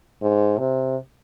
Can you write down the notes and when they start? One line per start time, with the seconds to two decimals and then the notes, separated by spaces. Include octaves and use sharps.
0.22 G#2
0.59 C3